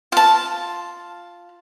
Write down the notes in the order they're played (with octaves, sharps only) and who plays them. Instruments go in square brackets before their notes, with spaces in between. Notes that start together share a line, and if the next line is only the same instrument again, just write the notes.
[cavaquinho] F4 A5